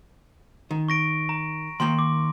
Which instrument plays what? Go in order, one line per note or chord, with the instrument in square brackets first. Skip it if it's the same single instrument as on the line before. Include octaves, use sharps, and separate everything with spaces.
[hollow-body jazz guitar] D#3
[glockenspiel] C#6 A#6 D7
A#5
[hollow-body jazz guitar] D#3 A#3 G5 [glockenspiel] C6
[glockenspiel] D6